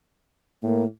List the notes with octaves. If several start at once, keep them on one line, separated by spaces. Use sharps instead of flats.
A2 A#3